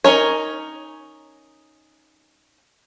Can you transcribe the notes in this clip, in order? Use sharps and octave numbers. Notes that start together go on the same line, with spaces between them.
C#4 D#4 A#4 C#5